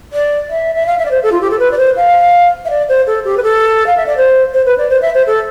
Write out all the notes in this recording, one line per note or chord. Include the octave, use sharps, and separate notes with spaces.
D5
E5
E5
F5
E5
D5
C5
A4
F4
G4
A4
B4
D5
C5
F5
E5
D5
C5
A4
G4
B4
A4
F5
E5
D5
C5
C5
B4
D5
C5
E5
C5
A4